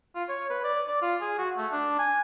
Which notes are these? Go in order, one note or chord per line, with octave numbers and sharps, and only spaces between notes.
F4
C#5
B4
D5
D5
F4
G#4
F#4
A3
D4
G#5